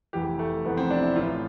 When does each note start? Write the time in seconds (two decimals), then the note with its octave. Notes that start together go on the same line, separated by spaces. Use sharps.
0.13 F1 F2 E3 G4
0.39 A3
0.65 F1 F2 E3 B3
0.77 C4
0.90 D4
1.03 E4
1.16 A1 A2 E3 F4